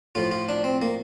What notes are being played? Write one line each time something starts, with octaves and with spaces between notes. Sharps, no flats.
A2 F3 F4
F4
D4
C4
A#3